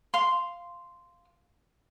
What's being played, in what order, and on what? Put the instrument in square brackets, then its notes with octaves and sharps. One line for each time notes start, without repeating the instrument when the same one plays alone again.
[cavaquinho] F5 C6